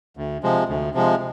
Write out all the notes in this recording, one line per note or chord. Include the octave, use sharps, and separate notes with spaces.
D2
C3 F3 G#3
D2
C3 F3 G#3